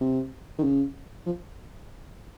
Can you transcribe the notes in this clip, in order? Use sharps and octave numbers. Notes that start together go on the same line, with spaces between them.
C3
D#3
C#3
F3